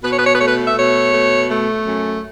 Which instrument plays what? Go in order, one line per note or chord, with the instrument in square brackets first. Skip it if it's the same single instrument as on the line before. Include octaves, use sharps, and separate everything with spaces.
[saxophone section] B2 B4
C#5
B4
C#5
B4
A3 C#5
B4
E5
B2 C#5
A3
A3
F#2